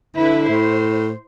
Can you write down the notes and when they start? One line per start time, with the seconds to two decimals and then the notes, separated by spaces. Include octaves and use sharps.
0.16 D3 E4 B4
0.49 A2 C5